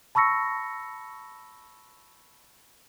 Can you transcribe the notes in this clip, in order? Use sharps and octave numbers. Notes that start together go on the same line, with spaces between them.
A5 B5 C#6 E6 A#6 C#7